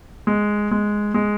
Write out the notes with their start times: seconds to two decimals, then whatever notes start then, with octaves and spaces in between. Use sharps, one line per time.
0.27 G#3
0.71 G#3
1.14 G#3